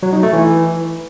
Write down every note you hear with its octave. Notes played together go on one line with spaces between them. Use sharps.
F#3
D#4
A3
E3